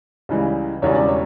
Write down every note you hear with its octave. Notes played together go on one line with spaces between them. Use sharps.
C#2 C#3 E3 G3
E1 E2 C#3 G3 D4 C#5
D5
C#5